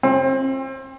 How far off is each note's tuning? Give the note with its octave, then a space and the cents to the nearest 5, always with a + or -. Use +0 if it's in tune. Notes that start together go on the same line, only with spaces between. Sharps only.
C4 +30